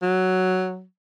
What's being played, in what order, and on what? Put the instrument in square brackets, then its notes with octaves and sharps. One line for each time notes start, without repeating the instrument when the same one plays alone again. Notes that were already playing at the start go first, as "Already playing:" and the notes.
[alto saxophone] F#3